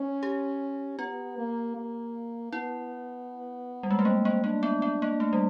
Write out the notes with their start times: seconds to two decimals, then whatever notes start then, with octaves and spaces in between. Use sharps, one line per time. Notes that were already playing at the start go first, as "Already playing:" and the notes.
Already playing: C#4
0.23 G4
0.99 B3 F4
1.38 A#3
1.76 A#3
2.52 B3 E4
3.83 G3
3.91 G#3
3.99 A3
4.05 A#3 C4
4.25 A#3
4.44 A#3 D4
4.63 B3
4.82 B3
5.02 A#3
5.20 A3
5.33 G3